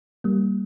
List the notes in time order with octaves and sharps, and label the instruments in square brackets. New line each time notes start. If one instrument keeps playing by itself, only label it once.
[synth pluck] G3 A#3